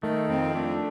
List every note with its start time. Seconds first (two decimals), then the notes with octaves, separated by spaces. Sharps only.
0.03 D#3 A3
0.29 F2 C4
0.55 A3 D4